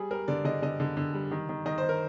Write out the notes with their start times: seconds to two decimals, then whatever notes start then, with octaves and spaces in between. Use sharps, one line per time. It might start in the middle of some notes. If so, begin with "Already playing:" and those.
Already playing: G3 G#4
0.11 G3 A#4
0.28 D3 D5
0.45 D3 D#5
0.62 D3 D#5
0.80 D3
0.97 D3
1.14 G3
1.31 D#3
1.49 D#3
1.66 D#3 D#5
1.78 C5
1.82 D#3
1.89 A#4